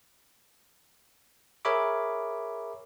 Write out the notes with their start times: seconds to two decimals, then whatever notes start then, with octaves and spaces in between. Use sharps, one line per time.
1.65 G#4 A#4 C#5 E5 B5 D6